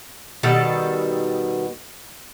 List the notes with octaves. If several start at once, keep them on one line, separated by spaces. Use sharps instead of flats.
B2 D#3 G3 A4